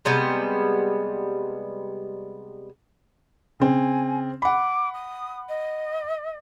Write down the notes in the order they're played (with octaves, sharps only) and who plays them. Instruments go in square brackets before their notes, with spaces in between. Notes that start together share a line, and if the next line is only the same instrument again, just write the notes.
[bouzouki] C3 G3 G#3 B3
[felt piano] C#3 C4 [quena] G#5
[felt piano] F#5 B5 [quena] D6
[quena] D#6
D#5